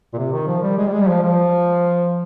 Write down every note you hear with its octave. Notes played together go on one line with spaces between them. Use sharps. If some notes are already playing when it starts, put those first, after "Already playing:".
A#2
C3
D#3
F3
G3
G#3
G3
G#3
G3
F3
F3